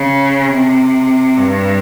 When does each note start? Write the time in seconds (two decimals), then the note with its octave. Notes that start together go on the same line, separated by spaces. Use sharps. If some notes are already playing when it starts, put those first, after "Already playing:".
Already playing: C#3
0.50 C3
1.37 G2